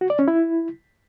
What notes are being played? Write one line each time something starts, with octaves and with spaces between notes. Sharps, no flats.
F#4
D5
C#4
E4